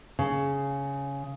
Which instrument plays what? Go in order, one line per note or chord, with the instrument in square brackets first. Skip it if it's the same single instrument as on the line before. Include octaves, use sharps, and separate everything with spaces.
[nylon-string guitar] C#3